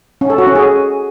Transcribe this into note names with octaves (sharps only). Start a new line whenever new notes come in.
C#4
A4
F#4
C#4
G#4